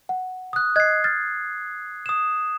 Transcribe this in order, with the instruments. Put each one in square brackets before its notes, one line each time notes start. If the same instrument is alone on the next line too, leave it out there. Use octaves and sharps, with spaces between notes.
[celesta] F#5
[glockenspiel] D#6 F#6
[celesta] D#5 F#6 [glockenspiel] G#6 C7
[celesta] F6 A6
[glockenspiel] D#6 E7